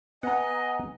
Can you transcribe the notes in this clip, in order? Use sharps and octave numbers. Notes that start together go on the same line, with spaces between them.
B3 D#5 F#5 G#5 A#5